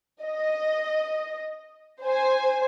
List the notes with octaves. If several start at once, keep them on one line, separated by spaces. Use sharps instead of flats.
D#5
C5 G#5